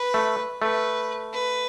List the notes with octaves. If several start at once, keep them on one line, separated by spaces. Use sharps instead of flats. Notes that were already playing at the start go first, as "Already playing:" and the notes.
Already playing: B4
A3
A3 B4
B4